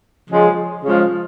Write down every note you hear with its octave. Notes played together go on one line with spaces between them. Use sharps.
C#3 F3 G#3
C#3 F3 G#3